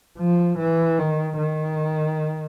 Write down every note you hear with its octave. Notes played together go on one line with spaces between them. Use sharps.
F3
E3
D#3
D#3